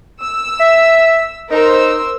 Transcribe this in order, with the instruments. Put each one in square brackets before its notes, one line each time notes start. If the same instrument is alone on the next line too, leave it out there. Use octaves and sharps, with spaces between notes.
[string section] E6
[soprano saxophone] E5
[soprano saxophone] D#4 [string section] A#4 C5 E6